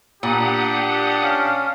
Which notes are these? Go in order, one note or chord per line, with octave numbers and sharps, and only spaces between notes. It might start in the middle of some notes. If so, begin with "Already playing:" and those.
A#2 D4 G4 F#5 D#6
C#4 F5